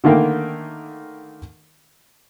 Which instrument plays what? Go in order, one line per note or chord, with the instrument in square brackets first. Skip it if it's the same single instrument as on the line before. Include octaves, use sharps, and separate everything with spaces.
[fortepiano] D3 D#3 A3 A#3 A#4 G5